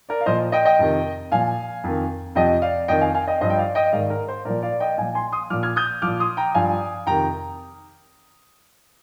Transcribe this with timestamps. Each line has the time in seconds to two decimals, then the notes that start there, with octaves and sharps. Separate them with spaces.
0.09 A#4 D5
0.21 F5
0.26 A#2 F3 C5 D#5
0.52 D#5 G5
0.65 D#5 G5
0.79 F2 C3 D#3
1.32 A#2 F3 F5 G#5
1.84 F2 D#3
2.35 F2 C3 F3 D#5 G5
2.62 D5 F5
2.88 F2 D#3 D#5 G5
3.01 F5 G#5
3.14 F5 G#5
3.27 D#5 G5
3.41 G2 F3 C5 D#5
3.50 G5
3.58 D5 F5
3.75 D#5 G5
3.92 G#2 D#3 D5 F5
4.10 A#4
4.28 C5
4.45 A#2 F3 A#4 D5
4.62 D5 F5
4.80 D#5 G5
4.98 A#2 F3 F5 G#5
5.15 G#5 C6
5.32 C6 D#6
5.50 A#2 F3 D6 F6
5.63 F6 G#6
5.76 D#6 G6
6.02 A#2 F3 D6 F6
6.20 C6 D#6
6.37 G5 A#5
6.54 G2 F3 F5 G#5
7.07 F2 C3 D#3 G5 A#5